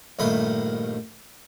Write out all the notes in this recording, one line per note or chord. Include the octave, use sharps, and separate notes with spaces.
A#1 G2 D#3 A3 B5 D#6